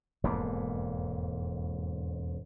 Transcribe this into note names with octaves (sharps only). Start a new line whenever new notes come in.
E1 F2 G#2 A#3